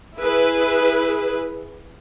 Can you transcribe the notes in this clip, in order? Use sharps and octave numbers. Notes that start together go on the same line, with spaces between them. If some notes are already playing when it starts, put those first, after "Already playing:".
E4 G#4 B4